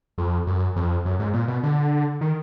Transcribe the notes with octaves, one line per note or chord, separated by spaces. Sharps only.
F2
F#2
F2
F#2
G#2
A#2
B2
D3
D#3